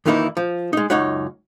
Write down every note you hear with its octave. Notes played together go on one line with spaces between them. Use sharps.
F2 D#3 E3 A#3 D#4 E4
F3
G#3 D#4
C#2 F#2 D#4 C#5 F#5